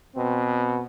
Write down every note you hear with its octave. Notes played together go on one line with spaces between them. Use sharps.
B2 C4